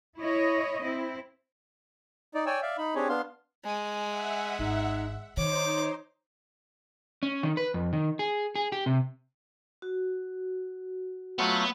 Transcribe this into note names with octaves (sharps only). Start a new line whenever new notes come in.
E4 C#5 D#5
C4 E4
D#4 D5
C#5 D5 G5 G#5 E6
D5 E5 F5
D#4 B5
C4 D4 G4 G#4 C#5
B3 D4 F5 C6
G#3 G#5
E5 F#5
G#1 D#4
D#3 D#4 C5 C#5 D6
C#4
D#3
B4
F2
D#3
G#4
G#4
G4
C3
F#4
F#3 A3 B3 F4